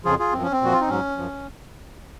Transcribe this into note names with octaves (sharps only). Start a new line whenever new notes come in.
F2 C#3 F3 F4 G#4
F4 G#4
F#2 F3 C4
C#4
C4
A#2 F3 F#4
F4
D#4
G#2 F#3 C#4
F#2 F3